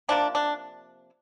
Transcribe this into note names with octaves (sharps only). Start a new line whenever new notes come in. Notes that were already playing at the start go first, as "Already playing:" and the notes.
C3 F3 A#3 D4
D4